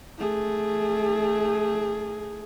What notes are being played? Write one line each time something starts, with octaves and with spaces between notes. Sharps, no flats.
A3 G#4